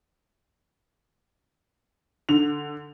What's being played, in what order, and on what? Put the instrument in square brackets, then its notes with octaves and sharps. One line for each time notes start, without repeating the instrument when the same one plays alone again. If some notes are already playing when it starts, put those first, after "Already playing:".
[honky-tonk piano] D3 F7